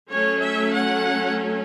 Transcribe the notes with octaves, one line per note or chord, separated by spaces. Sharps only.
F#3 A3 C#4 C#5
E5
F#5